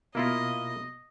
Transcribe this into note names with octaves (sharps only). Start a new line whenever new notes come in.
B2 A#3 E4 F4 D#5